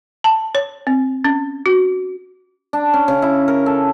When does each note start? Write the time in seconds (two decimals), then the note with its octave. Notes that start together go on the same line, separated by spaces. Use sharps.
0.24 A5
0.55 C#5
0.87 C4
1.24 C#4
1.66 F#4
2.73 D4
2.94 C#4
3.08 C#3
3.22 E4
3.48 A#4
3.66 A4